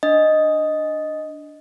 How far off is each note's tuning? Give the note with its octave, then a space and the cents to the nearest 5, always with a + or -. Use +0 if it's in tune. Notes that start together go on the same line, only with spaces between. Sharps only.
D4 +0 D#5 +0